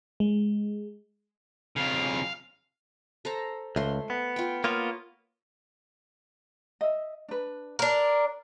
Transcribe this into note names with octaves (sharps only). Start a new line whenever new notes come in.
G#3
F2 C#3 F5
A4 C5 A#5
C#2 A3 C6
B3
F4 G5
A#3 B3 F4 C#5
D#5 E5
D4 B4
D4 A#4 B5